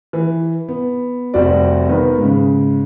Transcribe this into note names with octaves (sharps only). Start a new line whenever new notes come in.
E3
B3
F1 C3 G3 F#4 D5
D#3 B3 A#4 B4
G#2 C#3